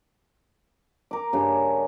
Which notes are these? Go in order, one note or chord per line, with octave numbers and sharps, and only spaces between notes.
A#4 D6
G2 C#3